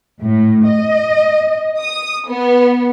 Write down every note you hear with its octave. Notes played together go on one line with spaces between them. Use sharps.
A2
D#5
D#6
B3